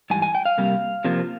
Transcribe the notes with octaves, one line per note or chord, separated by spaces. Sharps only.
G#2 E3 G3 G#5
G#5
G5
F5
C3 G3 A#3
C3 F3 A#3